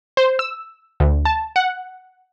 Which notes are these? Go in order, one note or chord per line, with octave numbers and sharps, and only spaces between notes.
C5
E6
D2
A5
F#5